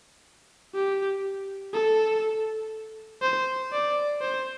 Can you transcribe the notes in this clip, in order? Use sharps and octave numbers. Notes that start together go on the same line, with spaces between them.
G4
A4
C5
D5
C5